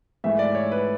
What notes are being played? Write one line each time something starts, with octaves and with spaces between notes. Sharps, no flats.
G#2 E3 A3 E5
D5
C#5
B4